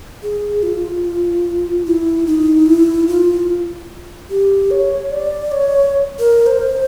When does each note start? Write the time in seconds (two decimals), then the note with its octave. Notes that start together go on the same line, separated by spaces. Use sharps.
0.23 G#4
0.63 F4
1.85 E4
2.26 D#4
2.66 E4
3.07 F4
4.30 G4
4.71 C#5
5.11 D5
5.52 C#5
6.19 A#4
6.46 C5